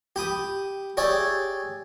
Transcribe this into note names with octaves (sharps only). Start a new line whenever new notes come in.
G4 B5 D#6
G4 G#4 C#5 D5 E5